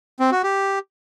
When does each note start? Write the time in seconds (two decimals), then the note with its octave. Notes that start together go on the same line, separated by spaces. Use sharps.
0.20 C4
0.31 F#4
0.43 G4